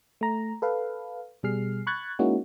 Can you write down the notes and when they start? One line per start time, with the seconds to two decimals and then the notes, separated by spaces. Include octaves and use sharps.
0.21 A3 A#5
0.62 A4 B4 F5
1.43 B2 G3 G#4 F6 C7
1.87 B5 C#6 F#6 G#6 A6
2.19 G#3 A#3 C#4 D#4 E4 F#4